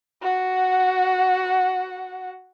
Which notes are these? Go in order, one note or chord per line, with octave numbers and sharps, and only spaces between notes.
F#4 F#5